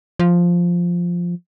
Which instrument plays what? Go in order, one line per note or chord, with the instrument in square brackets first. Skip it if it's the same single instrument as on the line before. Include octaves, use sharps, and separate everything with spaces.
[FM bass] F3